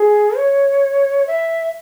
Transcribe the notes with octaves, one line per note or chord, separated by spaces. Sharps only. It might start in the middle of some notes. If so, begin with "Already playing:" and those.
Already playing: G#4
C#5
E5